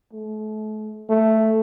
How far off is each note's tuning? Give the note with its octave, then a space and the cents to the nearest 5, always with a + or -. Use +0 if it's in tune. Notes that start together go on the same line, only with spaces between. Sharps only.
A3 -35
A3 +0